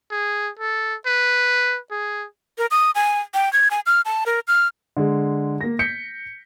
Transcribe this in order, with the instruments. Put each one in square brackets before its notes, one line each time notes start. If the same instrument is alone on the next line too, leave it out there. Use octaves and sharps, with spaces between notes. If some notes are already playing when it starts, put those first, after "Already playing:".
[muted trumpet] G#4
A4
B4
G#4
[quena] A#4
D#6
G#5
G5
G#6
G#5
F6
A5
A#4
F6
[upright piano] D3 G#3
A#3 A#6
G6 B6 C#7